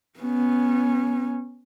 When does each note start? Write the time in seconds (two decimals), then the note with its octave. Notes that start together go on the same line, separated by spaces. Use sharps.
0.19 B3 C#4